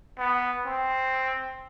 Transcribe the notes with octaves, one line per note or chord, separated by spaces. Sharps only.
B3
C4